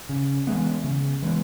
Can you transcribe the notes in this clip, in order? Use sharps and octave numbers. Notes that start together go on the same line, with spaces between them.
C#3
E3 G#3 B3
C#3
E3 G#3 B3